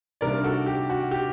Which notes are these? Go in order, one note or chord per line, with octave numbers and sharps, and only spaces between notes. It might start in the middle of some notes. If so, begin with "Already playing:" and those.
C3 D#3 G3 A#3 D4 A#4 D5
F#4 A4
G4
F#4
G4